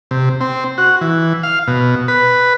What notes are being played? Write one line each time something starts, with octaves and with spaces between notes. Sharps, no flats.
C3
C4
F#4
E3
F5
B2
B4